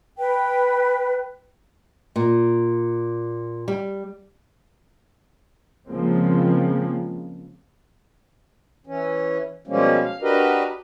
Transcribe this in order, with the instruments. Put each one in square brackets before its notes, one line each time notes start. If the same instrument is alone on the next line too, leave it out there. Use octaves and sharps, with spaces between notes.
[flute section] B4 G5
[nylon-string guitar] A#2
G3
[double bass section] C#3 F3 G#3 A#3 C4
[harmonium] E3 C#4
B2 F3 G3 G#3 A#3 C#4
F5
D4 F#4 G4 A#4 B4 D#5